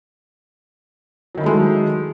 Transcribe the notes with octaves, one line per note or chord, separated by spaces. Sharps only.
D#3 F#3 G#3 A3 E4